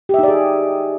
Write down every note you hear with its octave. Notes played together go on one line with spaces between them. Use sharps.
D#4 G4 G#4 D5 E5